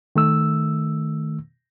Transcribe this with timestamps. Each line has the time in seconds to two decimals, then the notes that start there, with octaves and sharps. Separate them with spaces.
0.16 D#3 A3 E6